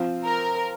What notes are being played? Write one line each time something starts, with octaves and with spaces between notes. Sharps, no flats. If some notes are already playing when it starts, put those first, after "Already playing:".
Already playing: F3 C4 F4 C5
A#4